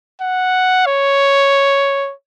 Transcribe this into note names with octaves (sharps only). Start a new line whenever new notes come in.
F#5
C#5